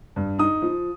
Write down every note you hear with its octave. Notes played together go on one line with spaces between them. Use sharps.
G2
D#4 D#6
F3